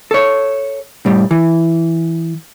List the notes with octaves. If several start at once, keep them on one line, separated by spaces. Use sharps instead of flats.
A4 C#5
A2 G3
E3